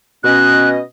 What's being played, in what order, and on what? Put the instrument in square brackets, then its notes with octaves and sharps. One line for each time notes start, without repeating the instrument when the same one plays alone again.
[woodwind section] B2 C#4 D#5 [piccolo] F#6